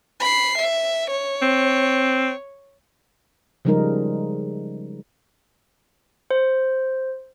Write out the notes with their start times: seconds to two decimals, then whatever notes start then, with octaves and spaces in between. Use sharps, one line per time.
0.20 B5 C7
0.57 E5
1.10 C#5
1.42 C4
3.65 C#3 F3 G3 G#3 D#4 A#4
6.31 C5